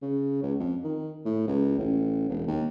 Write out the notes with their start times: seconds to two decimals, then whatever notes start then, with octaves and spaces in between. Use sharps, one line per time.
0.02 C#3
0.43 C#2
0.60 F2
0.84 D#3
1.25 A2
1.48 C#2
1.79 A1
2.29 E1
2.47 D#2